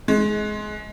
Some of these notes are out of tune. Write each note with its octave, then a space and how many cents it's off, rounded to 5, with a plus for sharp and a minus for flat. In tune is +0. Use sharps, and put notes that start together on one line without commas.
G#3 +20